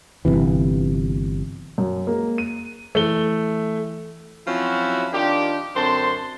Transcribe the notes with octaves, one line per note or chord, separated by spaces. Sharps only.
G1 C2 C3 E3
F#2
G#3 A#3
D#7
E3 A3 G7
F3 F#3 C4 C#4 E4 F#4
D#3 D4 F4 G4
F#2 D3 C4 C5 A5 C6